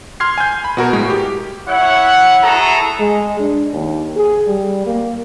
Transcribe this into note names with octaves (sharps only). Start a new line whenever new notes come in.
C6 F6 G#6 C7
G#5 G6
B5
B2 F#4 A#4
A2 G#3
G4
E4 C#5 E5 F#5
E4 F#4 G#4 A4 A#5
G#3
D4
D#2
G#4
G3
A#3